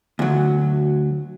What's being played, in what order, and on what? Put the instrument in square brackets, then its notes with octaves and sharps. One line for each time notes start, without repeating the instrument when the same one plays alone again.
[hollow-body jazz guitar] D2 F#3